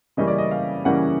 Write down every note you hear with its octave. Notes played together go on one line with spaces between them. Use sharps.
C#3 E3 G3 A#3 C#4 D#5
D5
D#5
F5
C#3 E3 G3 A#3 C#4 F#5